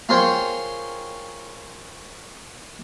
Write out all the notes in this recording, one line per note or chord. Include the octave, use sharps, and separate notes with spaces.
F4 G#4 A#4 C5 C#5 G5